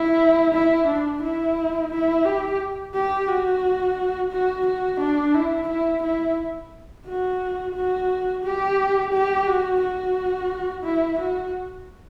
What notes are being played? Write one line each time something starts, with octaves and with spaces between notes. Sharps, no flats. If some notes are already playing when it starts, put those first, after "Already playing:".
Already playing: E4
E4
D4
E4
E4
G4
G4
F#4
F#4
F#4
D4
E4
E4
E4
F#4
F#4
G4
G4
F#4
F#4
E4
F#4